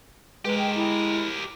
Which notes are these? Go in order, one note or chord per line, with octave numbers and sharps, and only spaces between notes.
G#3 G4 A#4 B4
G5
E4